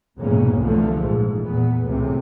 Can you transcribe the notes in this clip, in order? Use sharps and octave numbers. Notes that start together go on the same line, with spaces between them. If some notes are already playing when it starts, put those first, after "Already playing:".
F1 E2 G#2 B2 A#3 C#4
C2 D3 E3 F3 A3
A#1 G#2
E2 A#2 B3
C#2 A2 C3 E3 C4